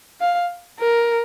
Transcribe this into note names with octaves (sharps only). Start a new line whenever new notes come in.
F5
A#4